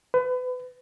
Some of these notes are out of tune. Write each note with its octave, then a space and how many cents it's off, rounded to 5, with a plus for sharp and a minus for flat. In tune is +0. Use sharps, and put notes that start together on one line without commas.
B4 +30